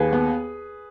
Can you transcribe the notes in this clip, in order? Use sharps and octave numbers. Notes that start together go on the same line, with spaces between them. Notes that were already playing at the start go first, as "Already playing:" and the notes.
Already playing: D#2 G#4 B4
B3